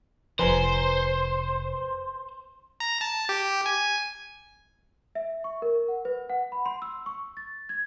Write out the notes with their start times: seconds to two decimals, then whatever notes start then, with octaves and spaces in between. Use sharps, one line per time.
0.39 F1 F3 B4 C5 G#5 A#5
2.80 A#5
3.01 A5
3.29 G4
3.66 G#5
5.15 E5
5.44 C#6
5.62 A#4
5.88 F#5
6.05 B4
6.30 F#5
6.52 B5
6.66 C6
6.82 E6
7.06 C#6
7.37 A6
7.69 G#6